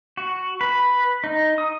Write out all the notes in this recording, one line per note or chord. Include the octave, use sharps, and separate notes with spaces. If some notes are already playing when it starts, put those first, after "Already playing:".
F#4
B4
D#4
D#6